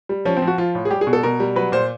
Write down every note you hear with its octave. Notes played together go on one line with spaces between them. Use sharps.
G3
F3 C#4
C4
F3
F#4
F3 F4
A2
G#4
G3 G4
G#4
B2
A4
B2 A#4
G3
F#3 B4
A#2 C5